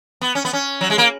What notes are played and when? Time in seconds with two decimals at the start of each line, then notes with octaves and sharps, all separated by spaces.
0.21 B3
0.35 C#4
0.45 B3
0.53 C#4
0.81 F#3
0.90 G#3
0.98 A#3